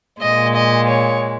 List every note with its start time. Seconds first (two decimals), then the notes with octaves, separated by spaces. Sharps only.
0.22 A#2 G#3 D#5
0.56 D#5
0.89 C#5